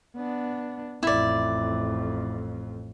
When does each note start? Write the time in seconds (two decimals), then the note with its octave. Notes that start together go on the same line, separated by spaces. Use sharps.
0.16 B3 D4
1.03 A1 F2 E4 D5